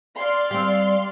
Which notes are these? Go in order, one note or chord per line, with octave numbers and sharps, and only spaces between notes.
D5 F5 C6
G3 C4